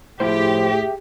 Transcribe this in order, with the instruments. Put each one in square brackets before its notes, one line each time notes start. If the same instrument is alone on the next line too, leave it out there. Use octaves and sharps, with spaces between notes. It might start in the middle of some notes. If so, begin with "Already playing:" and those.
[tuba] A2 [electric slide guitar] F3 E4 C5 [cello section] G4 [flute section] G#4 E5 G5